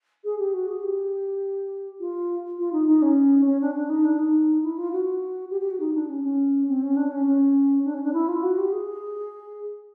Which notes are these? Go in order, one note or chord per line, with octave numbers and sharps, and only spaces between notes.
G#4
G4
F#4
G#4
G4
F4
F4
D#4
D#4
C#4
C#4
D4
D4
D#4
D4
D#4
E4
F4
F#4
G4
G4
F#4
D#4
D4
C#4
C#4
C4
C#4
D4
C#4
C#4
D4
C#4
D4
E4
F4
F#4
G4
G#4